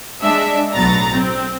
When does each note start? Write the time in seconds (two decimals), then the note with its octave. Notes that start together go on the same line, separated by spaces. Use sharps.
0.21 G#3 D4 E5
0.75 B1 A2 F#3 B3 A#5 A6
1.12 C4